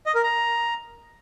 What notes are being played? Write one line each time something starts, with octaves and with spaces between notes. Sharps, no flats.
D#5
A#4
A#5